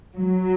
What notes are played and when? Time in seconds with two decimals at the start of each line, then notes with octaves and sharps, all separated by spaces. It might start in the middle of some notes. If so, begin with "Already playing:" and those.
0.17 F#3